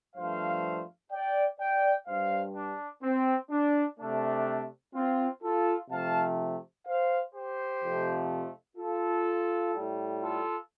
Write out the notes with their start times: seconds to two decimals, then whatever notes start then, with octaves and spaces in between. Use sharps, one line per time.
0.16 G2 F3 A3 C5 F5
1.11 D5 G5
1.59 D5 G5
2.07 G2 G3 C5 F5
2.55 D4
3.03 C4
3.51 D4
3.98 C3 A3 D4
4.94 C4 F4
5.42 F4 A4
5.90 C3 F3 A3 F5 A5
6.86 C5 F5
7.34 G4 C5
7.82 F2 C3 F3 A3
8.77 F4 A4
9.74 A2 G3
10.21 F4 A4